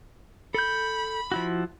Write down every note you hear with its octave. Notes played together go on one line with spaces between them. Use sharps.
A4 B5 G6
F3 E4 F#4